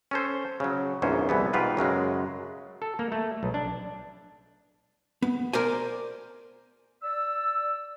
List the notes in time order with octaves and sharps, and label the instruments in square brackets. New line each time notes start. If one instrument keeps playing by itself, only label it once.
[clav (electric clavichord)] C#4 A4 C5
C#3 F#3
A#1 E2 G#2 C#4 C5
C2 E3 B3
G#2 B2 F4 G4 B4
F#2 C#3 F#3 G#3
A4
A#3
A3
B1
D4
[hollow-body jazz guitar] B3
A#4 C5 D5 G#5
[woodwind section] D5 E6